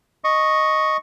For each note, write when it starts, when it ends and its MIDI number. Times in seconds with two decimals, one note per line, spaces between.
0.24 0.97 75
0.24 0.97 85